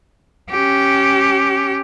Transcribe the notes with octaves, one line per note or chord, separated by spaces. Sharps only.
C#4 G4